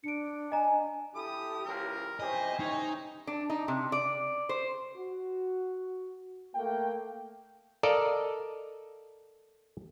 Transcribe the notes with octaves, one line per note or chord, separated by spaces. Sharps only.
D4 C#7 D7
D#5 G#5 A#5
E4 G4 A4 D#6
C#2 G#2 E3 A#4
E3 C#4 G4 C5 D#5 G#5
D#4 C#5
D4
D#4
C3
D5
C5
F#4
A3 A#3 G5
A4 A#4 D5 D#5 F5